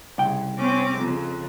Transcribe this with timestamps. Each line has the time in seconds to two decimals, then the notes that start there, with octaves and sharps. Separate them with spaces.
0.18 C2 C#3 G5
0.56 C4 C#4 D6
0.99 F2 C#3